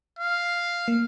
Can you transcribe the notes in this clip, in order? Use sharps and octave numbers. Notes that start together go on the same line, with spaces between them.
F5
A#3